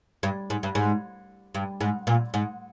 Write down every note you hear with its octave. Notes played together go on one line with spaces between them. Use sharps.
G2
G#2
G2
G#2
G2
G#2
A#2
G#2